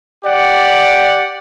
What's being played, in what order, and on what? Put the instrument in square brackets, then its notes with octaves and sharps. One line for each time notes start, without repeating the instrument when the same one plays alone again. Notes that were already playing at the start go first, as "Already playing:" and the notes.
[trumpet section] G4 D5 F#5